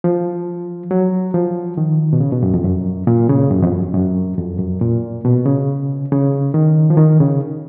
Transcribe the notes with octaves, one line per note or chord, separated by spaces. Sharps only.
F3
F#3
F3
D#3
B2
C#3
B2
F#2
F2
F#2
A#2
C#3
F#2
F2
F#2
F#2
F2
F#2
A#2
B2
C#3
C#3
D#3
F3
D#3
C#3